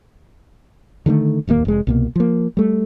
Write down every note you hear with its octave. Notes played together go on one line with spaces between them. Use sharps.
D3 D#3 G#3 A3
D1 D#2 C#3 A#3
F1 G#3
C2 B2 A#3
F3 A#3
G3 A3